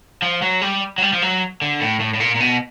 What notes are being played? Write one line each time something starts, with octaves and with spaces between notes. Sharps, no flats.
F3
F#3
G3
F#3
G3
F3
F#3
D3
A2
A2
A2
A#2
A#2
B2